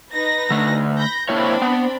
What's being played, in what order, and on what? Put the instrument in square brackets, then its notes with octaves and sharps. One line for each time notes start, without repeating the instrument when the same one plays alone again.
[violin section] D#4 B4 A#6
[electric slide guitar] D3 A3
[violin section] B5 G6 A#6
[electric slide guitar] A#3 E4 C#5 [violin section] C4 D4 B5
[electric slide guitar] B3